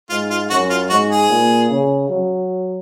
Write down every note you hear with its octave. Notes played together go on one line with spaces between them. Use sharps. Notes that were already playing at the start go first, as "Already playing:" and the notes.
G#2 F4
F4
F#2 F#4
F4
G#2 F#4
G#4
A#2
C#3
F#3